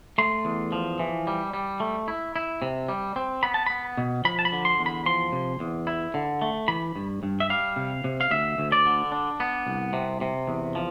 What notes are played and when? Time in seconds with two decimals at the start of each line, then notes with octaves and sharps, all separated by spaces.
0.18 A3 C6
0.45 E2
0.72 F3
0.99 E3
1.27 G3
1.54 G3
1.80 A3
2.08 E4
2.36 E4
2.62 C3
2.89 G3
3.16 C4
3.43 B3 B5
3.54 A5
3.67 B3 B5
3.98 B2
4.25 F3 B5
4.39 A5
4.45 B5
4.52 D3
4.65 C6
4.79 E2
4.86 B5
5.06 F3 C6
5.32 C3
5.60 E2
5.87 E4
6.14 D3
6.42 A3
6.68 E3 B5
6.96 G2
7.23 G2
7.40 E5
7.50 G3 F5
7.76 C3
8.04 C3
8.21 F5
8.31 D2 E5
8.58 D2
8.72 D5
8.86 D3
9.12 D4
9.40 B3
9.67 C2
9.93 C3
10.21 C3
10.48 E2
10.75 F3